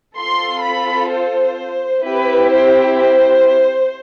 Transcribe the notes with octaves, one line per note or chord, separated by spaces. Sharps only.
C4 F4 A4 C6
B5
C5
C4 E4 G4 B4
C5
C5